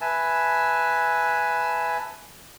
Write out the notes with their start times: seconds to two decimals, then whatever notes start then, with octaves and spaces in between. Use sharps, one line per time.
0.01 B4 E5 G#5 A5